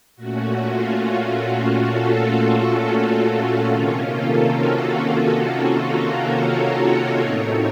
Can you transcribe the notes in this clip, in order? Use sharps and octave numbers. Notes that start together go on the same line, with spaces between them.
A#2 A3 C#4 F#4
F4
F#4
F#4
A4
F4
F#4
F#4
C3 D#3 A#3 C#4 F4
A4
F#4
F#4
A4
A#4
C#5
A2 A3 C4 D#4